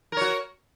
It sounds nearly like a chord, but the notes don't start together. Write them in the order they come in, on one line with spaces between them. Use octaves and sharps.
A#4 C#5 F#4